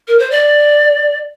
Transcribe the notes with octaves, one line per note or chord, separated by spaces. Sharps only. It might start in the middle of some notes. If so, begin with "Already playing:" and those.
A#4
C5
D5